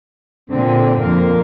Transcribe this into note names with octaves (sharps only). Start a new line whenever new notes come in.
A#2 D3 C4
F2 A#3 A#4